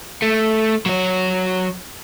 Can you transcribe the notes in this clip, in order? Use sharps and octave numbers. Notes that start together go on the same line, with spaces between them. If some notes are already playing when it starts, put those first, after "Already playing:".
A3
F#3 C#5